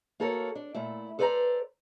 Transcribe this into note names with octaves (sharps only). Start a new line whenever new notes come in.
A#3 F#4 A4 A#4 C#5
D4
A#2 A3 E4
A4 B4 C5 D5 F#5 A#5